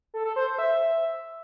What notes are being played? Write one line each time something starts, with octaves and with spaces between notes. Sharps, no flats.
A4
A4
C5
C5
E5